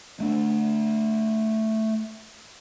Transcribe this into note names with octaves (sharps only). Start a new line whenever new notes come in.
A3 D4